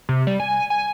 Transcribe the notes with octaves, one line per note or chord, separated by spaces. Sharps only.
C3
G3
G#5
G#5